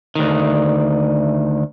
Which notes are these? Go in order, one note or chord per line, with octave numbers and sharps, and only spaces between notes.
D2 D#3